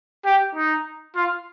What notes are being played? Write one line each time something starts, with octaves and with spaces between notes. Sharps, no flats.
G4
D#4
F4